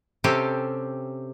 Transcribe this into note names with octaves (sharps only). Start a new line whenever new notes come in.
C3 C4 C#4 G4 A4